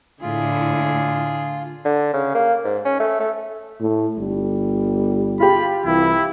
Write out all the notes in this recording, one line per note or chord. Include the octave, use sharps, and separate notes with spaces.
A2 D3 E4 F4 G#4
D3
C#3
A#3
G#2
C#4
A3
A3
A2
G1 G3
F4 G4 B5
C2 E3 E4